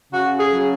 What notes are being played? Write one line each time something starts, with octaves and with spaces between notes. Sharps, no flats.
C#3 F#4
G#4
F#3